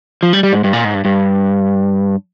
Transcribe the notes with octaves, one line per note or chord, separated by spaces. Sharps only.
F3
G3
G3
G#2
G2
A#2
G#2
G2
G2